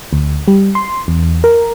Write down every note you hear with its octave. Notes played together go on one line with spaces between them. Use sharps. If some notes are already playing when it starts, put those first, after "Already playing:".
D2
G3
C6
E2
A#4